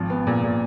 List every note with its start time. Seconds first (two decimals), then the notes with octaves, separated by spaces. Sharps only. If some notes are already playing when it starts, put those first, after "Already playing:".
Already playing: G#1 F3
0.10 B3
0.27 A#2
0.44 A#2